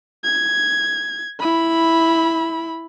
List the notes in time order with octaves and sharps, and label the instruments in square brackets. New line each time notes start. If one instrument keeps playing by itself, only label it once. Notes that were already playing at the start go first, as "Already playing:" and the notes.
[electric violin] G#6
E4 B5